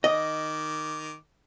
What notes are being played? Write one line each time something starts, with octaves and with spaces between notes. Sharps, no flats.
D#3 D#5 D6